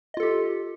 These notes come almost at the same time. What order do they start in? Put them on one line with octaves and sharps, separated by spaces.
D#5 F4 A4 G4